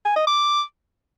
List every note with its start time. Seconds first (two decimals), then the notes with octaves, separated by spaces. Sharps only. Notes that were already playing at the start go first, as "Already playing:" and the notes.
0.05 G#5
0.16 D#5
0.27 D6